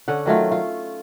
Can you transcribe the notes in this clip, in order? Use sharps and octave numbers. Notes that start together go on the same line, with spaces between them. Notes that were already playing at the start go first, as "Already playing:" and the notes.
D3 C#4 F#5
D#3 F#3 A3 F4
F4